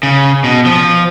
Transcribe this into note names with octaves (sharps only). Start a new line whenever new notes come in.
C#3
B2
F3